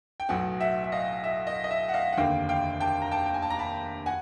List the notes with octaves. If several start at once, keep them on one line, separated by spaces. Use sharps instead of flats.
G5
B1 A2 F#3 B3 F#5 G#5
E5 F#5
E5
D#5 F5
E5
D#5
D#5
E5
F#5
D#5 F5
F#5
F1 D#2 D3 F5 G5
F5 G5
G5 A5
A#5
G5 A5
G5
G#5
A5
A#5
A5 B5
F#5 G#5